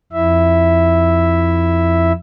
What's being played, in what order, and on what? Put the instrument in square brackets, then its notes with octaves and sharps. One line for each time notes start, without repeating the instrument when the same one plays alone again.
[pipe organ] F2 E4 E5